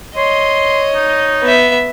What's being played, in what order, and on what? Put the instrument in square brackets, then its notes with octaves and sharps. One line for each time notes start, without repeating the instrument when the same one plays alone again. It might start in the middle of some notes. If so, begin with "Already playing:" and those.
[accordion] C#5 [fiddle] D#5 [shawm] C6
[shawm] D#4
[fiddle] B3 E5